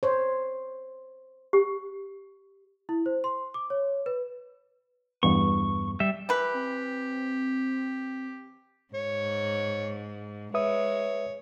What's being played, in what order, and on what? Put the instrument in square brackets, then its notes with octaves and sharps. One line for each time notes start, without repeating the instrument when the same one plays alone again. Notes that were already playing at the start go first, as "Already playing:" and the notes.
[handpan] C5 C#5
[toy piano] G4
[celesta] E4
C5
C6
D6
C#5
B4
[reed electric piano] E2 G2 B3 [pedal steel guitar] C#6
[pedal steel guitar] G3 E5
[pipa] E3 B4 [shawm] G4
[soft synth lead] C4
[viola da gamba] G#2 [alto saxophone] C#5
[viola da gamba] G#3 [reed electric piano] B4 E5 D#6 [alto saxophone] C#5